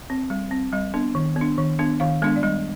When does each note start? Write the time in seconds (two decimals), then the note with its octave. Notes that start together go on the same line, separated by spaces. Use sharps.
0.10 C4
0.30 G3
0.51 C4
0.72 G3 D#5
0.94 B3 D4
1.15 D#3
1.36 B3
1.41 D4
1.58 D#3
1.79 B3 D4
2.00 D#3 F5
2.22 G#3 B3 D4
2.36 D5
2.43 G3 D#5